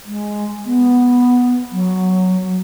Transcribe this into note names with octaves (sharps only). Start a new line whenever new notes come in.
G#3
B3
F#3